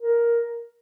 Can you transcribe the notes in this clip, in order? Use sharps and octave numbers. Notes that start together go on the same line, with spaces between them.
A#4